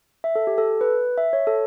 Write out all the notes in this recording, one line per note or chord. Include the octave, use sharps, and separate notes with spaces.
E5
A4
G4
A4
B4
E5
C#5
A4